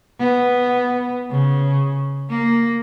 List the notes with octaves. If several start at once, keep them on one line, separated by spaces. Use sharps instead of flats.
B3
C#3
A#3